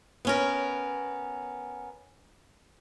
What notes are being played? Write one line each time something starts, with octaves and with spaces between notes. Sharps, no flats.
B3 C#4 A#4